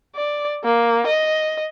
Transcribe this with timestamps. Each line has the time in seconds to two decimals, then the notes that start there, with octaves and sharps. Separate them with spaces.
0.15 D5
0.64 A#3
1.07 D#5